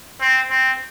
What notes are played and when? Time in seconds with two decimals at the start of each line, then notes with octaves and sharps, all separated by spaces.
0.21 C4
0.51 C4